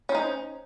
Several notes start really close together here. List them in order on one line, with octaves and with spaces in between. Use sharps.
C#4 C5 D#4